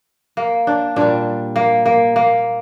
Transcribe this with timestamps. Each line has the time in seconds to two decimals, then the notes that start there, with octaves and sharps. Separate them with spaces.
0.37 A#3
0.67 D4
0.96 A#2 G3 D4
1.56 A#3
1.86 A#3
2.16 A#3